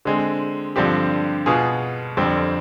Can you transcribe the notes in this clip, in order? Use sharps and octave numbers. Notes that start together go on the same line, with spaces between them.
D3 G#3 C4
G2 D3 F3 C4 G4
B2 B3 F4 G#4
F2 D3 G3 C4